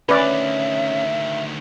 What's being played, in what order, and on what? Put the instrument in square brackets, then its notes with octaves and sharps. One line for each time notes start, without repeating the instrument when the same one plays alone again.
[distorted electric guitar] D2 D#3 [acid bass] C#4 [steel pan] B4 D5 [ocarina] E5